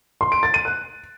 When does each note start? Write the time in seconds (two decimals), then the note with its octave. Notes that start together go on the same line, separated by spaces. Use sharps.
0.21 C6
0.32 D7
0.43 A6
0.54 D#7
0.65 F#6